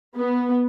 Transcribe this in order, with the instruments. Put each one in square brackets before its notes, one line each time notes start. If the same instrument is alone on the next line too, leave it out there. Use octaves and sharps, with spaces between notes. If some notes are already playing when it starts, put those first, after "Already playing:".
[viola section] B3